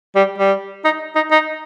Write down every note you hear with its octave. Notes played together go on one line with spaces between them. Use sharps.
G3
G3
D#4
D#4
D#4